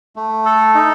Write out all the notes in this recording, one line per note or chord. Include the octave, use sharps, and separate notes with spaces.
A3
A4
D#4